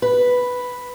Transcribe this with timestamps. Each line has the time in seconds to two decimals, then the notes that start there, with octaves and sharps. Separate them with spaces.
0.02 B4